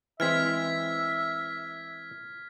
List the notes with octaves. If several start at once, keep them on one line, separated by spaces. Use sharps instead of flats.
E3 G#3 C4 E5 F6 G#6 B6